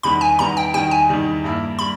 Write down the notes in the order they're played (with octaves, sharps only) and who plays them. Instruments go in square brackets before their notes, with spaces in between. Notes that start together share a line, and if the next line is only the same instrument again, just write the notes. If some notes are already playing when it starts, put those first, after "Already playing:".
[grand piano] E2 D#3 G3 B3 [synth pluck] B5
[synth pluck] G#5
[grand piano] E2 D#3 G3 B3 [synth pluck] A#5
[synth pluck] G5
[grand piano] E2 D#3 G3 [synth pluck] G5
[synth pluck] G#5
[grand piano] E2 D#3 G3
G2 G3 A#3 E4
[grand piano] G3 [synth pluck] B5